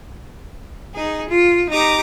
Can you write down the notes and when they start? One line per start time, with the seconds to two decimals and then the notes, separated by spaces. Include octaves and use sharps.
0.94 D#4 G#4
1.29 F4
1.70 D#4 G4 A#5 D6 D#6